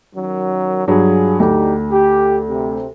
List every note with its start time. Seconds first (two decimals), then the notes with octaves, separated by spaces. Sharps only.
0.15 F#2 D#3 F#3
0.88 G2 F#3 F4 G#4
1.40 D2 D4 D#4 G4
1.91 G4
2.48 C3 C4